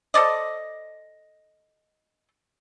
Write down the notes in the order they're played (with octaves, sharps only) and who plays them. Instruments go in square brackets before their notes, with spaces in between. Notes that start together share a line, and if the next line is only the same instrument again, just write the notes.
[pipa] A4 C5 D5 D#5